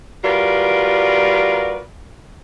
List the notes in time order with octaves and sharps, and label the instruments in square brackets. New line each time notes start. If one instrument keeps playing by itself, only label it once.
[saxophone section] G3 F4 F#4 A#4 B4 D5